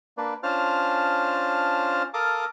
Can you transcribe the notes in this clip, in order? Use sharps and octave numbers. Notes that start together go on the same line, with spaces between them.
A#3 D4 B4 D5
C#4 D4 F4 C5 A5 F6
A4 A#4 F5 A5 D6 D#6